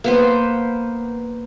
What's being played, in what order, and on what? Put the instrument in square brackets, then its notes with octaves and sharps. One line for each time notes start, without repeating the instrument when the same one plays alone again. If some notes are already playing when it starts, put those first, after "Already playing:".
[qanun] A#3 B3 C5